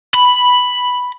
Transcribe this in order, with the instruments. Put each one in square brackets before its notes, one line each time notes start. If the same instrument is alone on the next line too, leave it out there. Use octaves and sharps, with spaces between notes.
[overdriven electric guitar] B5